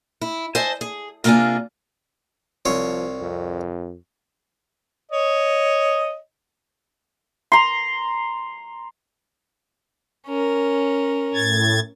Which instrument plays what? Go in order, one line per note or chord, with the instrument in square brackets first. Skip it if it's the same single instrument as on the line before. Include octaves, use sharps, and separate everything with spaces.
[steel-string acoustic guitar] E4
C5 D#5 E5 G#5 A5
G#4
C3 A#3 D4 F4 G#4 G#5
[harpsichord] C2 F4 C#5 [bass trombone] F3
[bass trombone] F2
[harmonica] C#5 D#5
[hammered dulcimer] A#5 C6
[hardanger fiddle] C#4 A#4
[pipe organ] A2 G#6 A6